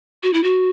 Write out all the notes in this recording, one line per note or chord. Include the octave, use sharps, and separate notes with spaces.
F#4
E4
F#4